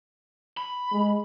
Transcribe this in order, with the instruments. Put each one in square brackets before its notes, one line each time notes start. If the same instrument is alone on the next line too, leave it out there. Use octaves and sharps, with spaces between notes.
[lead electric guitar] B5
[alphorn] G#3